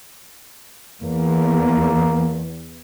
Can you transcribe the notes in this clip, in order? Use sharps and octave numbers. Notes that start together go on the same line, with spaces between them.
E2 A#3